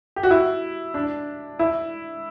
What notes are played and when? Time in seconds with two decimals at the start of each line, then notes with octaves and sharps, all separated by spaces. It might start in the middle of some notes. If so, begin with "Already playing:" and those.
0.16 G4
0.23 F#4
0.30 E4
0.94 D4
1.59 E4